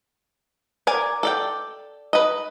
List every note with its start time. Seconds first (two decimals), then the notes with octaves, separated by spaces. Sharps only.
0.87 A#4 D5 G#5
1.23 A4 D5 G5
2.13 B4 D#5